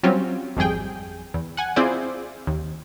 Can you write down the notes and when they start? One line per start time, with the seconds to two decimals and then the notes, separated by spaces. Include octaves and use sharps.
0.03 F#3 G3 C4 C#4 F4
0.57 G#1 F2 G3 G#4 G5
1.34 E2
1.57 F#5 G#5
1.76 C4 E4 F4 G#4 C5 D5
2.47 D#2